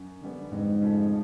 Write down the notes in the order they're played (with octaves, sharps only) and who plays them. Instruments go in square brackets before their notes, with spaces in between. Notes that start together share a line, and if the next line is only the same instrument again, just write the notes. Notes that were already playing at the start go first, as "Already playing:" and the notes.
Already playing: [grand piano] F#2
D3 G3 B3
[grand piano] F2 [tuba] G#2
[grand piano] C#3 F3 A3